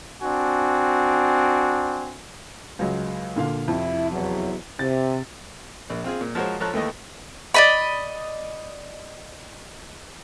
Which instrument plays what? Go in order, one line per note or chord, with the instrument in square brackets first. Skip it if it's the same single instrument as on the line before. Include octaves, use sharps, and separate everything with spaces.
[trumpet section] C4 D4 F#4 G#5
[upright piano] C#2 F#3 G#3
A#2 D3 F5
[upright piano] F2 C3 [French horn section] E4
[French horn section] E2 F#3
[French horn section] C3 [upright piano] A6
[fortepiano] A#1
C4 F4 G#4
A#2
F3 G#3 F#4 A#4 C5 C#5
F3 A4 C#5 A#5 F#6
D#2 E3 A3 A#3 D#5
[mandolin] D5 D#5 B5